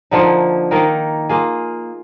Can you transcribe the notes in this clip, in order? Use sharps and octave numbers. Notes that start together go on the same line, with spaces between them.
D3 F3 A#3 D#4
D#3 A#3 D#4 A#4
A#3 F4 G#4